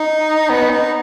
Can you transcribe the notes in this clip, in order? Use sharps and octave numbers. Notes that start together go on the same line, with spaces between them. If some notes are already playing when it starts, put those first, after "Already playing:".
Already playing: D#4
B3
D#4